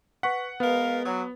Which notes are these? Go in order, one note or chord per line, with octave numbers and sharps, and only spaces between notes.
B4 F#5 C#6 B6
G#3 B3 A#4 B4 F5
F#3